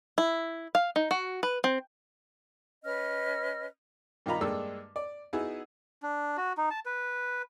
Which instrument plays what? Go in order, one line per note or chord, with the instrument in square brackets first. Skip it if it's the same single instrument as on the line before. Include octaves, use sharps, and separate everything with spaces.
[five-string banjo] E4
F5
D#4
F#4
B4
C4
[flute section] C#4 B4 D#5 F6
[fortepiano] G2 D#3 D#4 F4 A#5 B5
G2 G#3 A#3 D4 A4 E6
D5
B3 D#4 E4 F#4 G#4
[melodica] D4
F#4
D#4
A5
B4